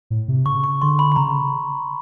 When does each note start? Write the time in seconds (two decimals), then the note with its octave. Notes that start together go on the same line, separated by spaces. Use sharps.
0.10 A2
0.28 C3
0.46 C#3 C#6
0.64 C#6
0.82 D3 C6
0.99 B5
1.12 B5
1.16 C#3 A#5